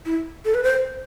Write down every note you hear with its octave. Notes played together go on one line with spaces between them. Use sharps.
E4
A4
B4
C5